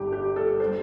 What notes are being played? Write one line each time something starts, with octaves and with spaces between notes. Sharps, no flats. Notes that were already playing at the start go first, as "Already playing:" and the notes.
Already playing: G1 G2 D3 G4
G4
A4
G3 C5